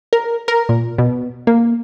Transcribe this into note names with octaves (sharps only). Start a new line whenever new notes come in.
A#4
A#4
A#2
B2
A#3